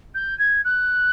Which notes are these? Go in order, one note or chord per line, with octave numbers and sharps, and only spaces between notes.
G6
G#6
F#6